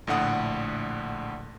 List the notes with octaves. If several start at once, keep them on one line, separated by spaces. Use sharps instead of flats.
A#1 A2 D3 F#5 D#6